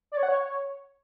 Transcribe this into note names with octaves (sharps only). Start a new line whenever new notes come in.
D5
C#5
F#5
C#5